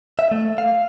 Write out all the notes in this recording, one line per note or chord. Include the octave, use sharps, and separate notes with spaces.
E5
A3
F5